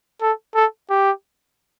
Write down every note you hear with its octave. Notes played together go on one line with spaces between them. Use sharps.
A4
A4
G4